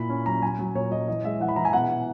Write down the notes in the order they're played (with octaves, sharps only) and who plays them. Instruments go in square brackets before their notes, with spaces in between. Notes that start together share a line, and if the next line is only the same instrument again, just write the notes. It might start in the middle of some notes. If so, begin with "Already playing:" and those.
Already playing: [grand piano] A#2 E4 B5
C#4
F#3 A#5
F#3 G#5
F#3
A#2 C#5
F#3 D#5
E3 D#5
G#3 E5
E3 F#5
B5
E3 A#5
G#5
B2 F#5
B2